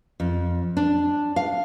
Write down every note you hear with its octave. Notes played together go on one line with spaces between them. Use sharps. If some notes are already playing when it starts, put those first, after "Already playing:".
F2
D4
F5